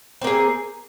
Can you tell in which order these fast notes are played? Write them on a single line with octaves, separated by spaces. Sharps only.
C4 A#3 G#4